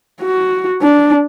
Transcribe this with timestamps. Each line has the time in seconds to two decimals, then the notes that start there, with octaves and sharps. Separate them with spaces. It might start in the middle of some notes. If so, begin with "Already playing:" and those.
0.22 F#4
0.83 D4